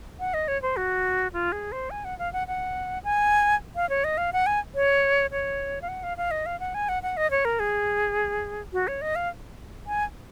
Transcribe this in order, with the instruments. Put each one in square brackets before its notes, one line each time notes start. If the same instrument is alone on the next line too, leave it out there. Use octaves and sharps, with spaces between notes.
[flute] F#5
D#5
C#5
C5
F#4
F4
G#4
C5
G#5
F#5
F5
F#5
F#5
G#5
F5
C#5
D#5
F5
F#5
G#5
C#5
C#5
F5
F#5
F5
F5
D#5
F5
F#5
G#5
F#5
F#5
D#5
C#5
A#4
G#4
F#4
C#5
D#5
F5
G#5